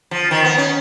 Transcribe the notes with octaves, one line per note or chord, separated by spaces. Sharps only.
F3
D#3
B3
C#4